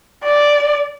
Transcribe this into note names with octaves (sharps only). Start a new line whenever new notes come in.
D5